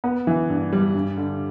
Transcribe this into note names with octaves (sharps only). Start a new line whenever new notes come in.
B3
E3
G2
G3
G2
D3